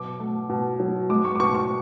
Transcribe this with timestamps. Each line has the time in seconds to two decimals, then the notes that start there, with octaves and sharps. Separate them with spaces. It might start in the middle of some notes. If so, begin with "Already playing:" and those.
Already playing: B2 F#3 D6
0.20 A3
0.49 B2
0.80 F#3
1.09 G#3 D6
1.25 C#6
1.36 D6
1.40 B2 C#6
1.55 C#6